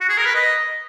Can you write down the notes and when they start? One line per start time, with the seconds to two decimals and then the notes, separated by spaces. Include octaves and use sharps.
0.01 F#4
0.09 G#4
0.17 A#4
0.26 B4
0.35 D#5